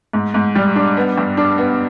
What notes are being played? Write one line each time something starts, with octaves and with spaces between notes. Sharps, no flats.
G#2
G#2
G3
D4
B3
G2
D4
B3